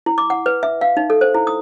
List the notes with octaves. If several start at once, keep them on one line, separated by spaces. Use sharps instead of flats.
E4
D6
F#5
B4
E5
F5
D#4
A4
C5
E4
D#6